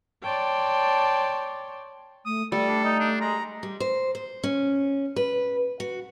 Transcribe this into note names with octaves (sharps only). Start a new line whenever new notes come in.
C#5 D5 G5 A5 C6
A3 D#6
G3 A3 A4
D4
D#4
D4
G#3 A#5
G3
C5
C5
C#4
B4
F#4